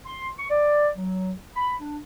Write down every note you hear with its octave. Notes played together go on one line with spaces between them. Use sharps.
C6
C#6
D5
F#3
B5
D4